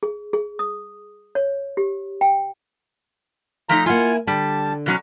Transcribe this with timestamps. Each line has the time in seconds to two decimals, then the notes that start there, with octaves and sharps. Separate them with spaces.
0.03 G#4
0.33 G#4
0.59 D#6
1.35 C#5
1.77 G4
2.21 G5
3.69 F3 A3 D#4 A#5
3.86 A#3 E4 F4 F#5 G#5
4.27 D3 G3 A5
4.86 B2 F#3 C#4